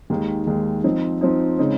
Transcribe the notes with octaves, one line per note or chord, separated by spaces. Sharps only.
D#2 D#3 G#3
D#2 D#3 G#3
F3 C4 D#4
F3 C4 D#4
C#3 G#3 C4 D#4